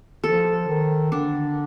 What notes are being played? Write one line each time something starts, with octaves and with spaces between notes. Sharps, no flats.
F3 A4
D#3
D3 D4